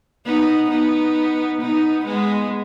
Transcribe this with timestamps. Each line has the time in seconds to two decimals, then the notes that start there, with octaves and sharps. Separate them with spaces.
0.25 B3 D#4
0.70 B3 D#4
1.60 B3 D#4
2.05 G#3 B3